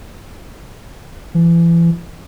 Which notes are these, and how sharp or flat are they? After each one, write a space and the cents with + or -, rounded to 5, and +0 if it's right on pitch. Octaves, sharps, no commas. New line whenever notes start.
E3 +35